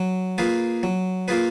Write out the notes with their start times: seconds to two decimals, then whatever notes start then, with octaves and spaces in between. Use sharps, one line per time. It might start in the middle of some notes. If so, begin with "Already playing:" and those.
Already playing: F#3
0.38 A#3 F4 G#4 B4
0.83 F#3
1.28 A#3 F4 G#4 B4